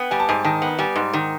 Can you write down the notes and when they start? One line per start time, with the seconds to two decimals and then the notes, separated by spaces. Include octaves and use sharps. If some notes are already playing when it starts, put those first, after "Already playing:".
Already playing: B3 G5
0.11 G3 G#5
0.20 A5
0.29 G#2 G#5
0.44 D#3 A5
0.62 B3
0.79 G3 G#5
0.96 G#2
1.13 D#3